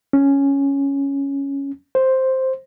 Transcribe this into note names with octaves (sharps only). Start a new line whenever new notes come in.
C#4
C5